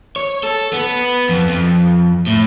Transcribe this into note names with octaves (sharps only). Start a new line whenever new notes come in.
C#5
A4
B3
F2
F2
A2